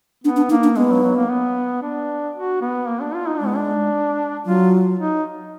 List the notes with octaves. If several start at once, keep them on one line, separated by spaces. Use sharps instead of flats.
B3 D4
D4
A#3 D#4
D4
G#3 B3
F#3
F#3
A#3
B3
D4
F#4
B3
A#3
D4
F4
D#4
G#3 D4
B3
D4
F#3 F4
D#4